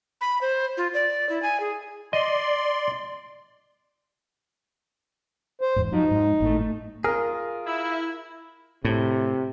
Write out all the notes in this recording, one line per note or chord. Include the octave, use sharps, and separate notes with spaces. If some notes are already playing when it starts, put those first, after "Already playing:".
B5
C5
F4
D5
E4
G#5
G#4
D5 D#5 C6
C5
E2 G#2
F3 F#3 D#4
G#2
G#1 A2 A3
A3
F4 G#4 A#4
E4
A2 C3